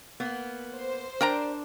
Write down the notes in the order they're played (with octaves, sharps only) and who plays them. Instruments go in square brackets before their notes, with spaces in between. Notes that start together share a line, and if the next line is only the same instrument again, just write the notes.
[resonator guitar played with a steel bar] A#3 B3
[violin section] C5
[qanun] D4 [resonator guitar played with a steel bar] G4 D5 [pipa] A#4 G5 A#5